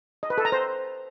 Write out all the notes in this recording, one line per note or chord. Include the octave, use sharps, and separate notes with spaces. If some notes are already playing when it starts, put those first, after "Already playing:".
D#5
B4
A4
A#5
C5